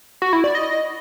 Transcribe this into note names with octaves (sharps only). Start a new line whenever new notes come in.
F#4
E4
D5
D#5